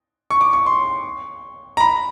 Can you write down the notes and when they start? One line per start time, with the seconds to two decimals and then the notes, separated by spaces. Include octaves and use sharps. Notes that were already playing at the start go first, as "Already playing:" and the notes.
0.31 C#6
0.41 D6
0.53 C#6
0.66 C6
1.77 A#5
1.80 B5